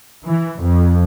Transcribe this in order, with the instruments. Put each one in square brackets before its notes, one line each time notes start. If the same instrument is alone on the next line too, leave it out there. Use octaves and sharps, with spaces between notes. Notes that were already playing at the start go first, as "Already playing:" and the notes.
[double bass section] E3
F2